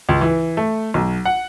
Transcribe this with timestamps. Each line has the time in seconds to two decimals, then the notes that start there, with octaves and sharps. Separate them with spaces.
0.09 C#2
0.21 E3
0.57 A3
0.94 B1
1.25 F#5